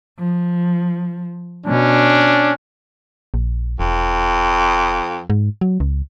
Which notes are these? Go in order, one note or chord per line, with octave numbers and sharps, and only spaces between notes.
F3
B2 C#4 D4
A#1
E1 F2
G#2
F#3
C#2